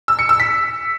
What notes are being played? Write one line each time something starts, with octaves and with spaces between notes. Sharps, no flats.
E6
C#7
E6
B6